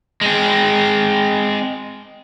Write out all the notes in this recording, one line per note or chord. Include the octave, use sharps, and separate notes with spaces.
G#3 C4